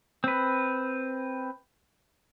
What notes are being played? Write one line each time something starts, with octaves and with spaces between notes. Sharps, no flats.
C4 B4